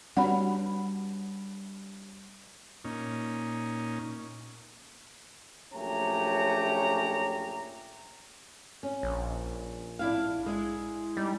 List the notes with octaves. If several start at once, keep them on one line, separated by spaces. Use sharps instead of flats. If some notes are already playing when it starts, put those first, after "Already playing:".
G3 D4 F#4 G4 B4 C#5 F#5 B5
A#2 C#4 D#4
A#1 F#2 A3 C#4 G4 A#5
C#4
A#1
D4 E4 F5
G#3 E4
G3 D#4